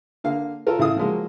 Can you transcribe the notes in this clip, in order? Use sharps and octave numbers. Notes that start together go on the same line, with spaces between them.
D3 A#3 F5
F4 A4 A#4
A1 E4 A4 F5 D#6
F3 F#3 G#3 A#3